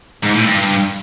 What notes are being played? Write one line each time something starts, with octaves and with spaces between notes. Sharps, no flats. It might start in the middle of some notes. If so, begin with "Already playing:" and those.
G#2
A2
G2